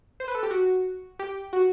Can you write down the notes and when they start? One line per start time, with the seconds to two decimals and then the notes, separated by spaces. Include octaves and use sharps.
0.20 C5
0.28 B4
0.35 A4
0.43 G4
0.51 F#4
1.19 G4
1.53 F#4